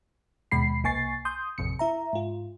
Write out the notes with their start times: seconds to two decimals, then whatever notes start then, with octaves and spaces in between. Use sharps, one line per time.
0.51 D#2 B2 G#3 B5 C7
0.84 C2 A#3 G#5 C#6 A6 C7
1.25 C6 D#6 G6
1.58 A1 F2 C3 C#7
1.79 E4 E5 A#5
2.13 G#2 F4